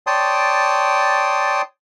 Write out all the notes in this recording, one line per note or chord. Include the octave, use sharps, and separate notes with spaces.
C#5 D5 G5 A5 C6 D#6